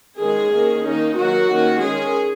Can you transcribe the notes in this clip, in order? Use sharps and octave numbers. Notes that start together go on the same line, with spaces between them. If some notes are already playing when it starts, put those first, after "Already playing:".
D#3 G#3 C#4 G#4
D#3 A#3 C#4
D#3 A#3 C#4 D#4
D#3 F#3 A#3 F#4
D#3 A#3 C#4
D#3 G#3 C#4 G#4